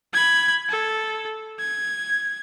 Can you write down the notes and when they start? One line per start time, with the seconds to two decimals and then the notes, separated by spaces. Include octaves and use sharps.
0.13 B5 G#6
0.69 A4
1.59 G#6